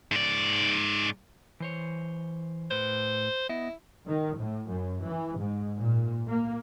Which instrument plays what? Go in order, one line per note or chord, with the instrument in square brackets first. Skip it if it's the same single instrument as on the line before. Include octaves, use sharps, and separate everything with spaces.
[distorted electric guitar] G#2 D5
[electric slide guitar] E3 C5 C#5
[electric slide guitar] A2 B4 [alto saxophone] C5
[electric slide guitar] B3 D#5 [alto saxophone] E4
[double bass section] D#3
A2
F#2
E3
G#2
A#2
A#3